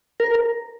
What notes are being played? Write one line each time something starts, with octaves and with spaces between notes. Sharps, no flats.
A#4